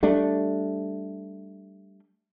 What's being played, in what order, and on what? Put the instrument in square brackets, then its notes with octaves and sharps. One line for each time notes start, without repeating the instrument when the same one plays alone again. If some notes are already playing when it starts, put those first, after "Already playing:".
[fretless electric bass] G3 A3 D4